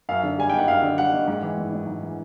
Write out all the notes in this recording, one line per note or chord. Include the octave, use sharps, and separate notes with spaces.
F#2 F5
D3
G3 G#5
F#1 G5
F#5
F#2 F5
D3
G3 F#5
F#1
G#2 F#5
E3
G#1
G#1
G#2
E3